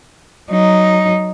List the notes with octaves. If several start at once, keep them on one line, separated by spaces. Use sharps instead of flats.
F#3 D#4